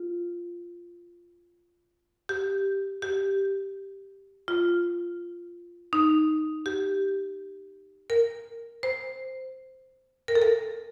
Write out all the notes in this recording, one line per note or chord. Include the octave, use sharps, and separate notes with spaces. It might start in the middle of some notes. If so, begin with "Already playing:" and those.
Already playing: F4
G4
G4
F4
D#4
G4
A#4
C5
A#4
A4
A#4